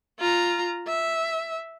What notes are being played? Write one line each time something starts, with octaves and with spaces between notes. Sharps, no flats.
F4 A#5
E5